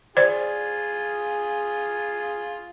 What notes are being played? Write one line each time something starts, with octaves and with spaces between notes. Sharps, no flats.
F4 G#4 C5 D5